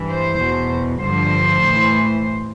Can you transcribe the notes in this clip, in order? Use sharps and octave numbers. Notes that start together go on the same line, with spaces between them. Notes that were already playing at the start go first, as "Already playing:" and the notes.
Already playing: G2 E3
C5
E2 B2
G2 D3 F3 C5
A2 E3